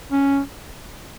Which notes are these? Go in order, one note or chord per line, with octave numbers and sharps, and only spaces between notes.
C#4